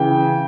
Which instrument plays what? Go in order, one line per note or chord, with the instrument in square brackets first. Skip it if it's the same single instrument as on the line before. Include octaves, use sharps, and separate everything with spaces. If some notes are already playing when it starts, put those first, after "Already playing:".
Already playing: [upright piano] C#3 E3 G5